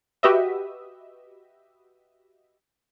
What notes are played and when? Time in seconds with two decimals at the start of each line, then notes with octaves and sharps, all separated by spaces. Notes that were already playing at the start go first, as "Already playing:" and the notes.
0.23 F#4 G4 B4 D#5 E5